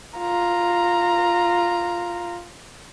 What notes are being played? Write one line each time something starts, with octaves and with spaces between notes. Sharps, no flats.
F4 A#5